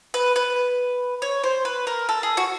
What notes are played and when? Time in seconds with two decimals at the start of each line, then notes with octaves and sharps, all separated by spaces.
0.14 B4
0.36 B4
1.22 C#5
1.44 C5
1.65 B4
1.87 A#4
2.09 A4
2.23 G#4
2.37 F#4